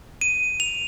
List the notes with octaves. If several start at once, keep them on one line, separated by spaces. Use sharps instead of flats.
D#7
F7